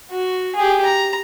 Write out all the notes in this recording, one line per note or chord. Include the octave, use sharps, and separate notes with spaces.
F#4
G4 G#4
A#5